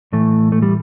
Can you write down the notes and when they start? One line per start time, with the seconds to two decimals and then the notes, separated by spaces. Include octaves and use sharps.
0.13 A2 E3 A3
0.52 A3
0.62 G3